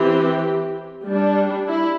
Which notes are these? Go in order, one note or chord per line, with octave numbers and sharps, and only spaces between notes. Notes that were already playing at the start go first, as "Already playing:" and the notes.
Already playing: E3 C4 G4
G3 D4
E4